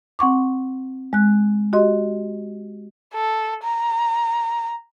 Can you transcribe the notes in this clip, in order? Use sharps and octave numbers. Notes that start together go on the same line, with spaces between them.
C4 F#5 C#6 D6
G#3 F#6
F#4 G4 D#5 C6
A4
A#5